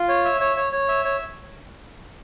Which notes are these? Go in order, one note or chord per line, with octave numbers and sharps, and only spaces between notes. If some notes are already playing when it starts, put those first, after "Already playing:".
Already playing: F4
C#5
E5
C#5
C#5
C#5
E5
C#5